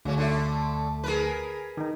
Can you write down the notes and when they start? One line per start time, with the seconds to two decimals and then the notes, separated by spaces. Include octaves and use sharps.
0.05 D2 C#3 C#4
0.18 D3 A3 E5
1.03 G#4 A#4 B4
1.77 D#3 D#4